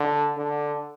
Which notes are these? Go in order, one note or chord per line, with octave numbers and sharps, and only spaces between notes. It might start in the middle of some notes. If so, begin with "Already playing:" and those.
Already playing: D3
D3